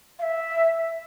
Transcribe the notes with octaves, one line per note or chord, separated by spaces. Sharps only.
F5
E5